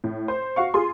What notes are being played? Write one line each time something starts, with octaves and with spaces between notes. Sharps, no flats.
A2
C5
F#4 F5 C#6
F4 G#4 C6